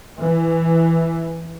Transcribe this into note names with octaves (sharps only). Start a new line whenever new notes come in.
E3